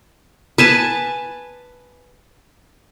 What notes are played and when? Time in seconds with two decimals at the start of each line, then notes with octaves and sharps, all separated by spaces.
0.58 B4 G#5 A5